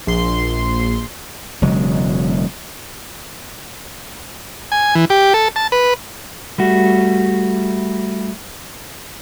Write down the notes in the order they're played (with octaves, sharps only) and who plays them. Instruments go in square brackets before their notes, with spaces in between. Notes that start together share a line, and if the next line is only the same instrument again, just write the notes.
[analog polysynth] A#1 C6
[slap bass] E1 C#3 F#3 G#3
[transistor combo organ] G#5
E3
G4
A4
A5
B4
[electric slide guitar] G3 A3 F#4